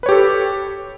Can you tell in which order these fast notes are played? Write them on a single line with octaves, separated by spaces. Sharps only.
B4 C#5 G4 A4